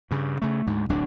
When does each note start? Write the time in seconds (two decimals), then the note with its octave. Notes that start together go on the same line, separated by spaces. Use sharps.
0.11 G2 C#3
0.42 C#3 A3
0.67 D2 G#2
0.89 D1 B1 E2 D4